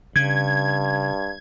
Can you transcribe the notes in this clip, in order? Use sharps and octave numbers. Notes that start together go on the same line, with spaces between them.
G2 C#3 G#6